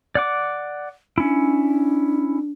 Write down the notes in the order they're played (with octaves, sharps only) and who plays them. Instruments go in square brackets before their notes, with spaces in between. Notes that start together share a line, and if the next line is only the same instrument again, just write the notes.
[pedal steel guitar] D5 F#5 D6
[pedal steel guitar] C#4 E4 [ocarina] D4